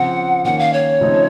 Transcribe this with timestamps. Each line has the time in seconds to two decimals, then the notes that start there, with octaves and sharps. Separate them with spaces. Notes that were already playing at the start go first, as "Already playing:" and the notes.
Already playing: C#3 F3 C4 F#5
0.44 D#3 A#3 C#4 F#5
0.59 F5
0.73 C#5
1.01 C#3 F3 A3 C4 D#4